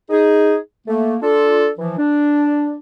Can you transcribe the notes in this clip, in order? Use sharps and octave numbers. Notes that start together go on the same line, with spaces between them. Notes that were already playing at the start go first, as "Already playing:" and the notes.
D#4 G#4
A3 A#3
D4 F4 A4
E3 F3
D4